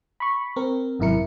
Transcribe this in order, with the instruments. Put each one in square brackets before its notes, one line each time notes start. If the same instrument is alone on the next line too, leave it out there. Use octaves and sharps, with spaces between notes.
[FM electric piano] B5 C#6
C4 A#4
G#1 F#2 C3 E4 A#4 C#7